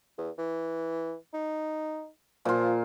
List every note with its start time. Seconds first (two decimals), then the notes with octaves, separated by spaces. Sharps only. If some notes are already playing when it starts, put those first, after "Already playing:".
0.18 E2
0.38 E3
1.34 D#4
2.45 A#2 F3 F4